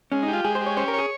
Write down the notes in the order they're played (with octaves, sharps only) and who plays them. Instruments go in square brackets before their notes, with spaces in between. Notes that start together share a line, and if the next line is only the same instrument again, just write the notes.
[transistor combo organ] G#3 [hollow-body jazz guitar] C#4
[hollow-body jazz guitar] D#4
[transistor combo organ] G4
[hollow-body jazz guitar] F4
[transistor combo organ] G#3 [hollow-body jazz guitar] G#4
[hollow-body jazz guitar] C5
[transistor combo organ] G4
[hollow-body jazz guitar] C#5
[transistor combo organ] C#4 [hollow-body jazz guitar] C5
[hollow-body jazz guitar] A#4
[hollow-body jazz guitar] G#4 [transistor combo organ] C#5